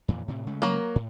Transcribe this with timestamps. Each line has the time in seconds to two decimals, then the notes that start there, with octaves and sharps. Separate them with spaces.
0.08 F2 A#2 E3
0.28 A2 C3
0.47 C#3 G#3 A3
0.62 F#3 A#3
0.96 A2